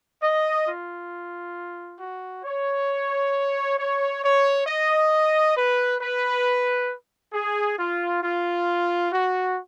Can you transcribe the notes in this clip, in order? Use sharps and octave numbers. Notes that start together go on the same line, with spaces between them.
D#5
F4
F#4
C#5
C#5
C#5
D#5
B4
B4
G#4
F4
F4
F#4